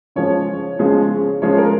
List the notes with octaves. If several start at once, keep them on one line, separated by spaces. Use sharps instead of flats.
C#3 F3 G#3 C#5
C#3 F3 G#3
C#3 F3 G#3 C#5
A#4